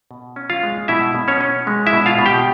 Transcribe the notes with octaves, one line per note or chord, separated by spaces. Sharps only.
B2
C#4
F4 F5
G#3
B2 E4 E5
B2
C#4 C#5
C#4
G#3
E4 E5
B2
F4 F5
B2
G4 G5